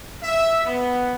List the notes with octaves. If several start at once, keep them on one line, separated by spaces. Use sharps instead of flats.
E5
B3